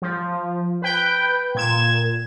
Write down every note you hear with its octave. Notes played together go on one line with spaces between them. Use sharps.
F3
B4 G5
A#2 G#6 E7